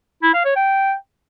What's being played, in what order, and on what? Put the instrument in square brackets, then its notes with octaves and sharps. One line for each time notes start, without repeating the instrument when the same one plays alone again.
[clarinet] E4
F5
C#5
G5